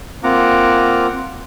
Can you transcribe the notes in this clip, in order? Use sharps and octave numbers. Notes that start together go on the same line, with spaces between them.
A#3 C4 F4 F#5 A#5 D6